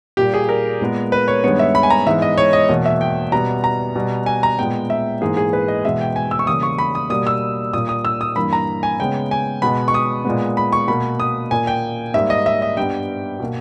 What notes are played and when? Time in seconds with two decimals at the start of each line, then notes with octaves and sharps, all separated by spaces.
0.17 A#2 G3 A#3 G4
0.34 G#4
0.49 A#4
0.81 A#2 G#3 B3
1.12 B4
1.28 C#5
1.44 G2 D#3 G#3 B3 C#5
1.59 E5
1.75 B5
1.83 G#5
1.90 A#5
2.07 G#2 E3 G#3 B3 E5
2.22 D#5
2.38 C#5
2.53 D#5
2.69 E2 B2 A#3
2.86 E5
3.01 G5
3.32 B2 G3 B3 A#5
3.64 A#5
3.96 B2 G3 B3
4.26 G#5
4.43 A#5
4.59 A#2 G#3 B3 G5
4.90 E5
5.21 G#2 E3 A#3 G#4
5.37 G#4
5.53 B4
5.68 D#5
5.84 E2 B2 G#3 B3 E5
6.00 G5
6.16 G#5
6.31 E6
6.39 C#6
6.47 E2 C#3 G3 A#3 D#6
6.63 C#6
6.78 B5
6.95 D#6
7.10 B2 G3 A#3 D#6
7.27 E6
7.73 A#2 G3 A#3 D#6
7.89 D#6
8.05 E6
8.21 D#6
8.36 G2 E3 A#3 B5
8.53 A#5
8.83 G#5
8.99 C#3 G#3 B3 G5
9.31 G#5
9.62 B2 G#3 B3 B5
9.88 C#6
9.94 D#6
10.25 A#2 G#3 B3
10.57 B5
10.73 C#6
10.88 B2 A#3 B5
11.20 D#6
11.51 A#2 A#3 G#5
11.67 G5
12.14 G#2 G3 A#3 E5
12.30 D#5
12.46 E5
12.62 D#5
12.77 G2 G3 B3 G5
13.40 B2 A#3